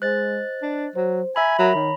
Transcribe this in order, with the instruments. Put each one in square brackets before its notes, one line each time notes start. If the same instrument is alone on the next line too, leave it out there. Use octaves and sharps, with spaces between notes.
[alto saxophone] G#3 [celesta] C5 D#5 [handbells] F#6 A6
[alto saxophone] D4
[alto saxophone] F#3 [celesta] C5
[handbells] E5 B5 [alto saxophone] G#5 [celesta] A#5 E6 B6
[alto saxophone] F#3 [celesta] A#4 E5 [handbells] A#5 B5
[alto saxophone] D#3 [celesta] C#5